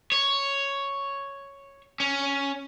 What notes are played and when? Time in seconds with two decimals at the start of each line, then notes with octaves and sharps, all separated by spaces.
0.12 C#5
2.00 C#4